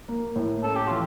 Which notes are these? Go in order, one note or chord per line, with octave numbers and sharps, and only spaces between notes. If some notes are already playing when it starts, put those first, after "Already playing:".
A#3
A2
C#4 A4
G4
E3 F4